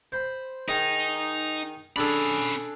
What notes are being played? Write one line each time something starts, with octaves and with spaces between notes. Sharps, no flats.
C5 B5
D#3 D#4 G#4
C#4 D4 G#4 A4 B5